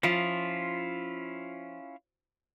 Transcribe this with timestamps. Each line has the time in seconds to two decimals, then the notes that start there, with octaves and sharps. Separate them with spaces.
0.03 F3 C#4 E4 F4